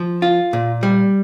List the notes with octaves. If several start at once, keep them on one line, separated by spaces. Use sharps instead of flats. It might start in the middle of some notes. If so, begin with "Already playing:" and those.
Already playing: F3
F4
A#2
G3